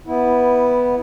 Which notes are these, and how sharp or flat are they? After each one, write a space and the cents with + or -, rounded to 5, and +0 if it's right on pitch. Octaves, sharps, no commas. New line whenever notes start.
B3 +0 E4 -15